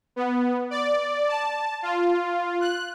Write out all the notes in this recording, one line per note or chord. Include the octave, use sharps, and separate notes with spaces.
B3
D5
A5
F4
F#6